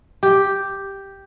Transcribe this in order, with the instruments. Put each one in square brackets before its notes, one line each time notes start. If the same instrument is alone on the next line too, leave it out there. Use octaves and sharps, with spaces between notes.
[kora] G4